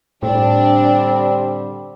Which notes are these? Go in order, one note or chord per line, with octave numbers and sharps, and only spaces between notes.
A2 D3 G3 C4 D4